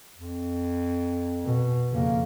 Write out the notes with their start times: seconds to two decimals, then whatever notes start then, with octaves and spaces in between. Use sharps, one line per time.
0.18 F2
1.45 B2
1.91 F2 C#3 A#3